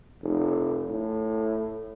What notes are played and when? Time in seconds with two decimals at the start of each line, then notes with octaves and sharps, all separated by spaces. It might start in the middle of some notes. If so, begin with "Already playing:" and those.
0.23 F1
0.90 A2